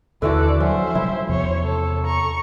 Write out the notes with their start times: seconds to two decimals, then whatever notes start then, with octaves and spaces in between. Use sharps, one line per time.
0.22 D#2 D3 E3 F#4 A4 D5
0.60 F3 F#3 C#4 C5 E5
0.95 C3 F3 G3 E4
1.29 E2 C3 C5 C#5
1.62 A4
2.05 A#5 C#6